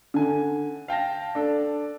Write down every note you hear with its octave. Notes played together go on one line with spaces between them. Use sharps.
D3 G#5
F5 G5 A5 A#6
D4 A4